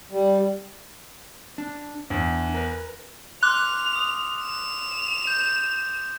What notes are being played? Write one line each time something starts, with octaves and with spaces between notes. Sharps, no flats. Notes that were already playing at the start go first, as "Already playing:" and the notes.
G3
D4
E2 D4
A#4 B4
C6 D6 F6 F#6 F7
D#6
E7 F7
G6